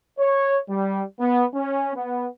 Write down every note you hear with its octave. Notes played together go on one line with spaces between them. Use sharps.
C#5
G3
B3
C#4
B3